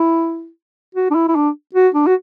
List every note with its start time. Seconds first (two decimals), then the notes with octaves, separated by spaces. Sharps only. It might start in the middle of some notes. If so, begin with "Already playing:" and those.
Already playing: E4
0.95 F#4
1.10 D4
1.15 E4
1.28 E4
1.35 D4
1.74 F#4
1.94 D4
2.07 F#4